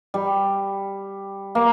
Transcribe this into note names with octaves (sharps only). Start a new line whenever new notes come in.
G3
A#3